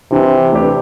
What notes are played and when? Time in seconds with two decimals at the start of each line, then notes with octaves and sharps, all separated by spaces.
0.11 C3 E3
0.53 A3 D4 G4 B4